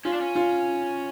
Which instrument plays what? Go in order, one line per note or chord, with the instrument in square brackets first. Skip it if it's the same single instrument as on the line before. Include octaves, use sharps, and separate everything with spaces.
[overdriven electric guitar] C#4 [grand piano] F4
[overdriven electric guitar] D4
C#4
[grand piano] F4